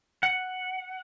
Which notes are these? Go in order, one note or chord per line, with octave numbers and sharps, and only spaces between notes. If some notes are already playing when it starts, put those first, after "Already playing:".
F#5